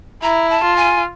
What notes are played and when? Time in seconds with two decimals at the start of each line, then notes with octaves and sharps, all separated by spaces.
0.23 E4 A#5
0.50 A5
0.63 F4
0.77 G#5